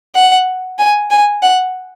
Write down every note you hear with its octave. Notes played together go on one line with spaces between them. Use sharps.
F#5
G#5
G#5
F#5